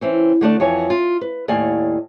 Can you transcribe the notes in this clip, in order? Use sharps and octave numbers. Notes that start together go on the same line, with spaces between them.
E3 C4 C#4
D3 A3 D4 D5
F2 E3 C#5 G#5
F4
B4
D#2 A2 D5 F5 G#5